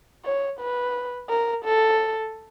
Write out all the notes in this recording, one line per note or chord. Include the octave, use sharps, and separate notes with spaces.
C#5
B4
A#4
A4